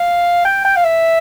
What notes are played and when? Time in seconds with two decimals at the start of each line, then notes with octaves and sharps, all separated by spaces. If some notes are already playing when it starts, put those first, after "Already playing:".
Already playing: F5
0.45 G5
0.65 G5
0.76 F5
0.84 E5